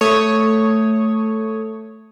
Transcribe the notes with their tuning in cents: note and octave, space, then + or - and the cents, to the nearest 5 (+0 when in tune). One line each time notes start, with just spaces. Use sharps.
A3 +0 C#5 +0 D#6 +5